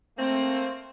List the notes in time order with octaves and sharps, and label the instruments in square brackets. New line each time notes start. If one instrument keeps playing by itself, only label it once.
[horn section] A3 A#3 C4